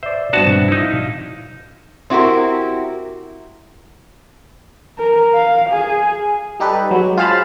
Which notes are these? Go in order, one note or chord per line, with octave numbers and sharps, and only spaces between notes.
C5 D5 E5
G2 B3 C4 D4 F#4 A5
E5
D#4 E4
F5
C4 E4 F#4 G4 A#4
A#4
F5
G#4
G3 D#4 G4 A4 B4
F#3 G#3
F4 G#4 C5 F5 A5 B5